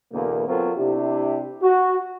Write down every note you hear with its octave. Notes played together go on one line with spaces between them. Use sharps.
E2 B2 D3 A#3
F#3 B3 C4 F4 A4 A#4
C3 D4 E4 G4
F#4